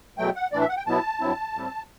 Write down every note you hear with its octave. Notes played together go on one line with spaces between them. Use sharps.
E2 B2 F#3 A3 G5
F#5
A2 E3 A3 D4 D5
E5
F#5
G5
B2 F#3 B3 E4 A5
G2 F#3 C4 E4
A2 G3 C4